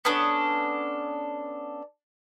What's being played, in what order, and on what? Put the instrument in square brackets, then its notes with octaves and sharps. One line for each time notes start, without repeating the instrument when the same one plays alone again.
[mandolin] B3 C#4 D4 A4